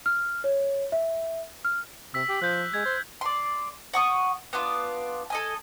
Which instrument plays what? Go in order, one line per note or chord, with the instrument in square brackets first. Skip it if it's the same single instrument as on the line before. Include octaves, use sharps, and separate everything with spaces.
[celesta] F6
C#5
E5
F6
[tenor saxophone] C3 [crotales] E6 B6
[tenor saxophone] G4
[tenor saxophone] F3 [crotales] F#6 G6
[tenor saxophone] G#3 [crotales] G#6
[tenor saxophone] C5
[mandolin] D5 C6
F#5 C#6 D#6
B3 D4 F4
A4 D#5 G#5